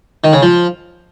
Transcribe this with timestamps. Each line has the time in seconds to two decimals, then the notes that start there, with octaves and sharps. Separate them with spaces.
0.24 D#3
0.33 C#3
0.42 F3